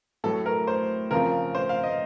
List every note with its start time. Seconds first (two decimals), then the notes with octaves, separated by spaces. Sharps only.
0.24 A2 F#3 A3 A4
0.46 A#4
0.67 C5
1.11 C#3 F3 C4 F4 A#4
1.55 C5
1.69 F5
1.84 D#5